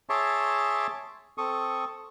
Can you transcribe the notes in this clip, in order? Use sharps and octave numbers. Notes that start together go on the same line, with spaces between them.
G#4 C#5 E5 A5 C6 D6
C4 A4 C#6 D#6